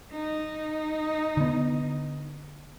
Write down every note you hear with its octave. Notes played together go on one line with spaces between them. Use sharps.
D#4
D3 B3